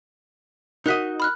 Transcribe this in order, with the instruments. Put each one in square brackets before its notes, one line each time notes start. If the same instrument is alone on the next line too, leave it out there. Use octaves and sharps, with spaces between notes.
[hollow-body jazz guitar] D#4 F#4 D#5 [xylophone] A#4 F#6 B6
[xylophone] B5 F6 F#6